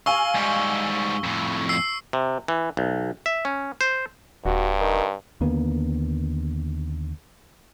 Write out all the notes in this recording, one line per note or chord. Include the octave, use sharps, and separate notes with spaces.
F5 G#5 C#6 E6 G7
G#2 G3
F2 A2
E6 C7
C3
E3
B1
E5
C#4
C5
D#1 G2 F#4
D#3
D#2 D3 A#3 B3